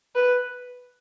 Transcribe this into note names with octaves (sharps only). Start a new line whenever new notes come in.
B4